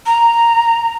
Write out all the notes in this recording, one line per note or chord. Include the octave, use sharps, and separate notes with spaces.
A#5